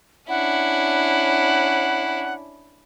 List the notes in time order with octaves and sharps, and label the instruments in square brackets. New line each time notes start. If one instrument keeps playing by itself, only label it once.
[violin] C#4 D4 [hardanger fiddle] E4 [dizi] F#5